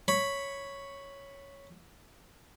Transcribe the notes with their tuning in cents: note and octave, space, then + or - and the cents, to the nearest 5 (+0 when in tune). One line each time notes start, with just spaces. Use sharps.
C#5 +0 B5 +0